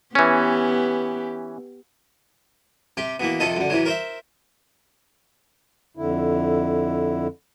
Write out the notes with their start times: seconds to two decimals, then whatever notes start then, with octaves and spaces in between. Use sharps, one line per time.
0.15 E3 B3 C#4 G4
2.97 C3 G4
3.20 B2 E3 A#3
3.40 F2 C3 D#3 A4 D#5
3.56 F#2 D3
3.70 C3 E3 F#3
3.86 A#4 C5 E5
5.97 F2 D3 E4